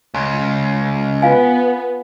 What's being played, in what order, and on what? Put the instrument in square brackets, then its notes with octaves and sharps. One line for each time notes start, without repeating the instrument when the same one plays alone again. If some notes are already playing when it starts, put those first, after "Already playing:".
[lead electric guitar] C#2
[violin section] B3 [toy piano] F4 F5 G#5